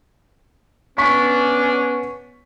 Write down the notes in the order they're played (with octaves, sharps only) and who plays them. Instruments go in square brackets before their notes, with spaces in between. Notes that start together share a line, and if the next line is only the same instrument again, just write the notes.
[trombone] B3 [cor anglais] C#4 [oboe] D4 [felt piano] C#6 B6